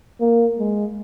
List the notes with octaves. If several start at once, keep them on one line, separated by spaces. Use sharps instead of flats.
A#3
G#3